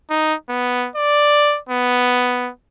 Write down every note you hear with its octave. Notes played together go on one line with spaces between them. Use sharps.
D#4
B3
D5
B3